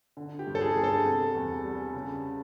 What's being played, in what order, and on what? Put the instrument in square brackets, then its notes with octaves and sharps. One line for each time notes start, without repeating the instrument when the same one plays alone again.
[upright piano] D3
G4
G2
A4
G#4
G2
A4
C3
E2
G3
C#3